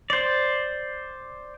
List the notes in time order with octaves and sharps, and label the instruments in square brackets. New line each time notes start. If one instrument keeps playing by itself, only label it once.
[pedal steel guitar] C5 D5